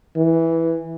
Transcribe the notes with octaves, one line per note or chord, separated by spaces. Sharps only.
E3